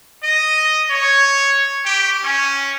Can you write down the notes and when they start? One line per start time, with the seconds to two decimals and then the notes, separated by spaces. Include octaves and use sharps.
0.23 D#5
0.89 C#5
1.85 G4
2.23 C#4